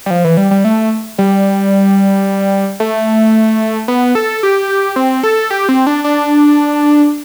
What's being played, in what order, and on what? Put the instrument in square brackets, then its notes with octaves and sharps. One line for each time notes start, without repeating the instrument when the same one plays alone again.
[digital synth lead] G3
F3
E3
G3
G3
A3
G3
A3
B3
A4
G4
C4
A4
G4
C4
D4
D4